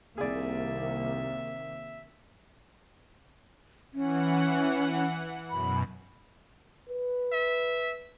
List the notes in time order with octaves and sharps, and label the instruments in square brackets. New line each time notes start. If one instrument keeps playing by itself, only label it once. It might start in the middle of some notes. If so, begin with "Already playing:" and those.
[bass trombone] C2 [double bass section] C3 D#3 A#3 [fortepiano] G#4 D5 [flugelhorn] E5
[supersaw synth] E3 F#5 [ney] C#4
[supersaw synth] F#2 B2 [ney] B5
[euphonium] B4
[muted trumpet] E5